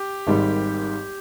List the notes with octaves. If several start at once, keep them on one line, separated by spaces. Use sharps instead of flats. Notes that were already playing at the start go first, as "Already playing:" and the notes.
Already playing: G4
G#1 G#2 D#3 G3